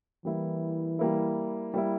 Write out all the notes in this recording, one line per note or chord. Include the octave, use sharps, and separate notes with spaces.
E3 G3 A#3 E4
G3 A#3 E4
G3 A#3 E4